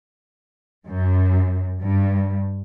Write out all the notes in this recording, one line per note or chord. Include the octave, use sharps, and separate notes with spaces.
F#2
G2